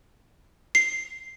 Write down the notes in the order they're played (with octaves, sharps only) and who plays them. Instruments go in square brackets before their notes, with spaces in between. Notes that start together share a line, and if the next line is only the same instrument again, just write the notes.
[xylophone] C7